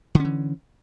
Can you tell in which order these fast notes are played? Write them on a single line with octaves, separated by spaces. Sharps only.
D3 C#4 E3